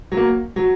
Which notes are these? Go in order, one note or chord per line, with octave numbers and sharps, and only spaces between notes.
F#3
A#3
F#3